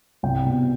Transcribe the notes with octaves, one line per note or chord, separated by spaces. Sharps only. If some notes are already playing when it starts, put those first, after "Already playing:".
C2 G5
B2